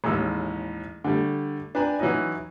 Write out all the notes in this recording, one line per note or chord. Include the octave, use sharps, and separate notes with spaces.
A1 D#2 G#3 E4 E6
D3 G3 A3
D4 B4 G5 G#5 A#5
E3 F#3 C#4 D#4 E4 D#5